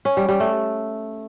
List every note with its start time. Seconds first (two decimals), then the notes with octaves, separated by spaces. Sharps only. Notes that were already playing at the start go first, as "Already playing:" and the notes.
0.05 C#4
0.17 G3
0.29 G3
0.40 A3